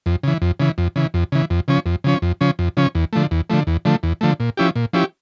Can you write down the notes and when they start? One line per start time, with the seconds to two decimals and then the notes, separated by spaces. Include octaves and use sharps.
0.06 F2
0.23 C#3 E3
0.42 F2
0.60 C#3 E3
0.78 F2
0.96 C#3 E3
1.14 F2
1.32 C#3 E3
1.50 F2
1.68 C#3 F3 C#4
1.86 F2
2.04 C#3 F3 C#4
2.22 F2
2.41 C#3 F3 C#4
2.59 F2
2.77 C#3 F3 C#4
2.95 E2
3.13 D3 F3 A3
3.31 E2
3.50 D3 F3 A3
3.67 E2
3.85 D3 F3 A3
4.03 E2
4.21 D3 F3 A3
4.40 A#2
4.57 F3 C#4 E4 G4
4.76 A#2
4.93 F3 C#4 E4 G4